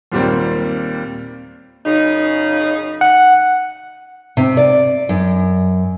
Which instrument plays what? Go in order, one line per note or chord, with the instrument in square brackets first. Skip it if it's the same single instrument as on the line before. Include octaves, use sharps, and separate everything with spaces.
[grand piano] D#2 A#2 G3 A#3 C4
[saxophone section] F#2 C#3 D#4
[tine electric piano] F#5
[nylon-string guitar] C3
D5
F#2